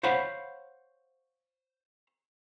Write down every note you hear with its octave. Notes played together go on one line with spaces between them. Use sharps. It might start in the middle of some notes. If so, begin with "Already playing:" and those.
C5 C#5 F5 F#5 B5